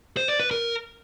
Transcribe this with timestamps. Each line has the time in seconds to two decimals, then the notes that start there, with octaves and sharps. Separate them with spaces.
0.17 C5
0.28 D5
0.40 B4
0.51 A#4